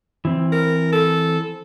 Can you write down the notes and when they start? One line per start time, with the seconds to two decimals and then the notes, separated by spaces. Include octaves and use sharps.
0.25 E3 C4
0.52 A#4
0.92 A4